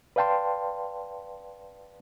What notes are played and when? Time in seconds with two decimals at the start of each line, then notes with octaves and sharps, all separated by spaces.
0.16 B4 D5 F5 G5 A5 C6